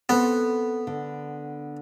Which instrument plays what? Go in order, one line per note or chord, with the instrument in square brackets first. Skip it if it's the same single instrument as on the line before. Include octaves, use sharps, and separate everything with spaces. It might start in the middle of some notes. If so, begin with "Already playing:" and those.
[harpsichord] B3 [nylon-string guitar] C4 A4
[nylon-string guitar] D3